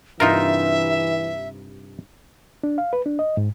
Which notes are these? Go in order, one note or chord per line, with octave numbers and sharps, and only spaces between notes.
G2 C3 E3 D#4 F4 A#4 E5
D4
F5
B4
D4
D#5
G#2